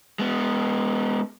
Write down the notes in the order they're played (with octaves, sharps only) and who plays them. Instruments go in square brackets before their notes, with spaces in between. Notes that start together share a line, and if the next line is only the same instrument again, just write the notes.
[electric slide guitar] G#3 B3